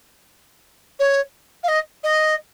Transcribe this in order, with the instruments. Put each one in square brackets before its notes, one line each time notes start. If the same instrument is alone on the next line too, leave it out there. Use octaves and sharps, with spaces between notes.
[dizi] C#5
F5
D#5
D#5